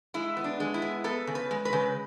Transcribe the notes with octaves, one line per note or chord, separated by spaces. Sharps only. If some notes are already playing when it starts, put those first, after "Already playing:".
G#3 E4
B3
D4
G#3
E4
B3
B3 A4
C#3
B4
G#3
B4
C#3